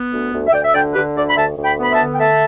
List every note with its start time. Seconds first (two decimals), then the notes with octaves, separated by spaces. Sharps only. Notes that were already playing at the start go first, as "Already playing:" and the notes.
Already playing: B3
0.10 D2
0.32 D2
0.47 E5
0.52 D2 D5 G5
0.64 E5
0.73 D3 D5 G5
0.94 D3 G4 B4
1.15 D2 A4 D5
1.28 B5
1.36 D2 E5 A5
1.57 D2
1.64 G5 B5
1.77 B3
1.83 B5
1.92 E5 A5
1.99 D3
2.15 G5
2.19 A3 E5 A5